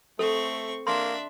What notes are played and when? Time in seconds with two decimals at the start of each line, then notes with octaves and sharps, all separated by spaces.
0.19 A3 C4 A4 C#6
0.87 A#3 D4 E5 C6